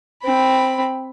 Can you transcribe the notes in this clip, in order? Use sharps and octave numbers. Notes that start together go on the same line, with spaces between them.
C4 B5